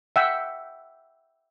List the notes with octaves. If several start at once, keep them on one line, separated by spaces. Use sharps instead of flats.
E5 F#5 G5